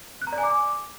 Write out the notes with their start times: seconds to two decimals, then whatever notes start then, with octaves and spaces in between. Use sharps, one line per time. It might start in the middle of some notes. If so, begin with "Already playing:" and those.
0.22 F#6
0.27 A#5
0.32 D5
0.38 G#5
0.43 D6